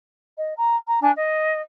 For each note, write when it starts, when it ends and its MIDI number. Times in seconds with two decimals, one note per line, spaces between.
0.36 0.51 75
0.57 0.75 82
0.86 0.98 82
1.00 1.10 62
1.00 1.10 80
1.00 1.10 81
1.15 1.61 75